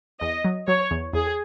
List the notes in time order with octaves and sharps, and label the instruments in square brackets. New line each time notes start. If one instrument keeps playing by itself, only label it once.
[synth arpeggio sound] E2 [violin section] D#5
[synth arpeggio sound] F#3
[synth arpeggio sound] F#3 [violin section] C#5
[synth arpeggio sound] E2
[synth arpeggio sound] E2 [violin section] G#4